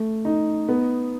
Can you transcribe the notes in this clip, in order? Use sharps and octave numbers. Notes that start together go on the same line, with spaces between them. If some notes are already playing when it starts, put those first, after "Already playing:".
Already playing: A3
D#4
B3